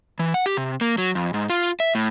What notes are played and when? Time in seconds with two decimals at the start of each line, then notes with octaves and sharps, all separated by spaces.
0.19 E3
0.34 F#5
0.46 G4
0.57 C3
0.81 A#3
0.98 F#3
1.15 F2
1.34 G#2
1.50 F4
1.80 E5
1.95 A2